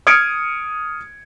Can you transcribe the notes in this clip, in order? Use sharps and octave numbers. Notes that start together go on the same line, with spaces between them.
D#6 F6 G#6 C#7 D7